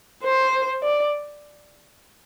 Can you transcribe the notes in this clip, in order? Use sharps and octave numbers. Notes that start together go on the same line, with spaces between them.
C5
D5